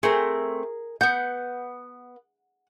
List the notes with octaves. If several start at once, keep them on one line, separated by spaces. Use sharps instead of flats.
A3 C4 G#4 A#4
B3 F#5 G6